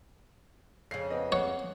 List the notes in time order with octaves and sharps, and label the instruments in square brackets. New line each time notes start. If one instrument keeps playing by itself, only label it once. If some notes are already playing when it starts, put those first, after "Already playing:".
[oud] F2 C#3 [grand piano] C7
[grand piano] B3 C4 D#5
[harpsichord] C#5 [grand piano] F#5